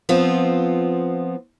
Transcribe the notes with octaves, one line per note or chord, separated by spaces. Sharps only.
F3 B3 C4 F4